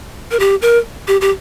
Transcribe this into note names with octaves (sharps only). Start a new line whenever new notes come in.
A#4
G4
A#4
G4
G4